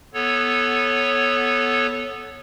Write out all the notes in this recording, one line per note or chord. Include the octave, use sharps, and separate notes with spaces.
B3 A4 C#5